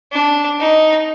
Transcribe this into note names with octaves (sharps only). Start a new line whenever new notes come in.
D4
D#4